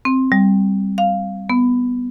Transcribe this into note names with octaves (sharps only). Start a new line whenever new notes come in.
C4
G3
F5
B3